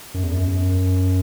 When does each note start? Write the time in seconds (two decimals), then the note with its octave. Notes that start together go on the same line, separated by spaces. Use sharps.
0.14 F#2
0.23 E2
0.33 F#2
0.48 F#2